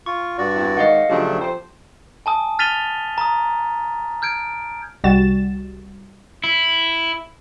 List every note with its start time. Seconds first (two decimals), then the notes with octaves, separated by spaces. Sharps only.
0.06 F4 C#6
0.38 G2 F#4 D5
0.56 E2 C4 E4
0.77 G#2 D#3 D#5 F5 F#5
1.10 C#3 F3 F#3 A3 D4 G4
1.40 F2 C5
2.26 G#5 A5 D#6
2.59 F6 A6 B6 D#7 F7 G7
3.18 A#5 D#6
4.22 F6 G6 G#6 D7
5.04 C2 G3 F#4 A6 E7
6.44 E4